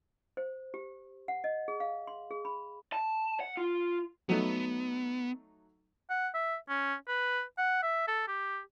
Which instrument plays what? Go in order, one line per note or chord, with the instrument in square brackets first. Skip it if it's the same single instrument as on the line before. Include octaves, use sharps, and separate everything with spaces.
[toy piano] C5
G4
F#5
D#5
G#4
F5
C6
G#4
B5
[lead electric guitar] A5
F#5
F4
[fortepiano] F#3 A3 D#4 [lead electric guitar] B3
[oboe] F#5
E5
C#4
B4
F#5
E5
A4
G4